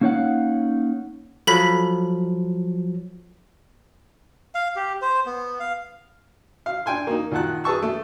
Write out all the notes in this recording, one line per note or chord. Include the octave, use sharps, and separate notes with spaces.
A#3 C#4 D#4 C#5 F5 F#5
F3 F#3 A4 B5 B6
F5
G4
C5
B3
F5
F5
D4 G5 G#5 C6
A#3 D#4
A#2 D#3 F#5 A5 F#6
G#4 B4 A5 C#6 E6
A3